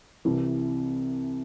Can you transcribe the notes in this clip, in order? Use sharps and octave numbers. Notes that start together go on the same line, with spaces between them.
C2 C3 E3